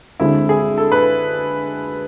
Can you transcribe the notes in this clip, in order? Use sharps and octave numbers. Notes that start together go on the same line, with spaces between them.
D2 D3 G#3 C4 E4
G#4
A4
B4